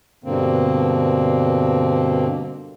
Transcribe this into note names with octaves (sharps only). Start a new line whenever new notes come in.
G2 B2 D3 A#3 C4